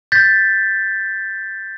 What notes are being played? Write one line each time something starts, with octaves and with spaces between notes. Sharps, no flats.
G6 A6 B6